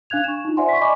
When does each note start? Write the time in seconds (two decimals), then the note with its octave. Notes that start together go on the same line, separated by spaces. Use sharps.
0.10 D4 F5 F#6 G#6 F7
0.24 C#6 E7
0.45 D#4 F4
0.57 C5 D5 E5 F#5 G#5 C6
0.69 C#6 B6
0.81 D5 D#5 G#5 B5 C#6 D6